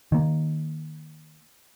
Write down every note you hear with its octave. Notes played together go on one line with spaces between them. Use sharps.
D#3 A#3